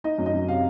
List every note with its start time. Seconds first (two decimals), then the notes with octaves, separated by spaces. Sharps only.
0.04 D#4 D#5
0.18 F#2
0.26 D#5
0.33 F#2
0.48 C3 F5